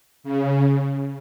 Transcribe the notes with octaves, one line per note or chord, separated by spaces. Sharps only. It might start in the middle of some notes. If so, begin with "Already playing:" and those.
C#3